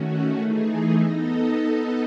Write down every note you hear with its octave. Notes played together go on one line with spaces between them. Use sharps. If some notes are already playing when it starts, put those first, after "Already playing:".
Already playing: D#3 A3 C#4 F#4
E3 A3 D#4 G#4
B3 D#4 A4 D#5